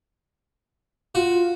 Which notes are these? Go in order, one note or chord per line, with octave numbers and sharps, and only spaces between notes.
F4 F#4